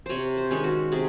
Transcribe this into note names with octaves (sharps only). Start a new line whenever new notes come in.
C3 C5 C#5
C5
D#3 G#3 C#4
F#4
C3 G#4